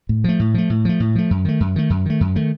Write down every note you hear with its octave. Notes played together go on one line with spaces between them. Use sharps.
A2
F3 A3
A2
F3 A3
A2
F3 A3
A2
F3 A3
F#2
D#3 A3
F#2
D#3 A3
F#2
D#3 A3
F#2
D#3 A3